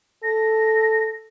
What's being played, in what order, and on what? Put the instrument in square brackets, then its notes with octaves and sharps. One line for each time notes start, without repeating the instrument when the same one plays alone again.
[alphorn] A4 [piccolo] A#6